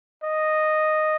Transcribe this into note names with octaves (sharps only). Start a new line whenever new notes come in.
D#5